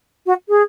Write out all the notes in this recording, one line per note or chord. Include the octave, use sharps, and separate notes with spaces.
F#4
G#4